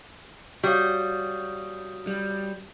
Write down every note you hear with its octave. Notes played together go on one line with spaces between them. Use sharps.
G3 F#4 C#5 F5 D#6 G6
G3